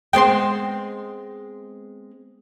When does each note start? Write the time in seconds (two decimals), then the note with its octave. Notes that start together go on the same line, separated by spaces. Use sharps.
0.13 G#3 B3 C4 G5 C6